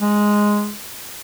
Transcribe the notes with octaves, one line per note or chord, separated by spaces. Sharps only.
G#3